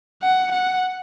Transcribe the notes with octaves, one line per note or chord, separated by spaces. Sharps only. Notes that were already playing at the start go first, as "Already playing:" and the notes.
F#5
F#5